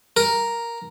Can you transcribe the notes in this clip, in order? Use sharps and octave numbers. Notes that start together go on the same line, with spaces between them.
A#4